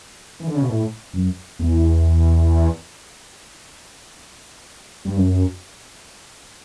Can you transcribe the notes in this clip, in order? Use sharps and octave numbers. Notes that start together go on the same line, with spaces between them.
E3
D3
C#3
B2
A2
F#2
E2
G2
F#2